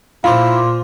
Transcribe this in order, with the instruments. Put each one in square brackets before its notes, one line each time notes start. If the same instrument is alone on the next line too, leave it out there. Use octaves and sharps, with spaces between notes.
[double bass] A#2 [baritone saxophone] E4 [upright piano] F4 C5 [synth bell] F5 C6 D6